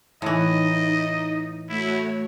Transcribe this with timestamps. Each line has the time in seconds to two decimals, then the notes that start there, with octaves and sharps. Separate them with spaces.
0.22 A2 E3 D#4 D#5
1.69 A3 E4 F#4 C#5